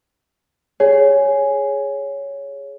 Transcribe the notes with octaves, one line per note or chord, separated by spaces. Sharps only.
G#4 C#5